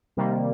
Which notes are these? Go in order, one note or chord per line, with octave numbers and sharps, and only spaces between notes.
C3 D#3 G3 A#3